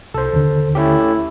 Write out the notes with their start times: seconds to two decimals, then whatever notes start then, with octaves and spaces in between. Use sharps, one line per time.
0.14 C2 A4 C5
0.33 D#2 D3
0.75 A3 C#4 E4 G4